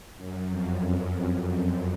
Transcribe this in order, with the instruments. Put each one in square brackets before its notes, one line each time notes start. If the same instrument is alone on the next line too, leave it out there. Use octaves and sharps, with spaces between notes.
[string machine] F#2
F2
F#2